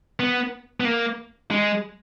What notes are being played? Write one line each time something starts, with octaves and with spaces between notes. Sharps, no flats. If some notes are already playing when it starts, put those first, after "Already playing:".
B3
B3
A#3
G#3